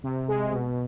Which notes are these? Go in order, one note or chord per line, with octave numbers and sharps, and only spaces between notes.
C3
G#3
B2